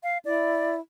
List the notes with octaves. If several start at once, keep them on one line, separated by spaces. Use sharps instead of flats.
F5
E4 D5